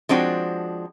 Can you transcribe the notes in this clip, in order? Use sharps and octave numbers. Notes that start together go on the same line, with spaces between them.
F3 G#3 C4 D4 F#4